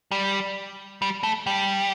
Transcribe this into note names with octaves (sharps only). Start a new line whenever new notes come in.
G3
G3
A3
G3